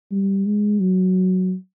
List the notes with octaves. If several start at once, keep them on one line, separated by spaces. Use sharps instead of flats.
G3
G#3
F#3